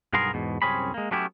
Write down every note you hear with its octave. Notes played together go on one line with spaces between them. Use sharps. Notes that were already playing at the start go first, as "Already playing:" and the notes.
B1 G2 B3 G#4 A#4 C6
E2 G#2 B2
C2 F#2 C4 C#4 G#4 B5
G#3 A#3
F#3 A3 B3 C#4 E4 G4